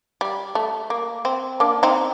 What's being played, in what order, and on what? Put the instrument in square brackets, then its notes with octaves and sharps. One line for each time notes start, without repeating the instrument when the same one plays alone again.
[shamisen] G3
A3
A#3
C4
A#3 D4
C4 D#4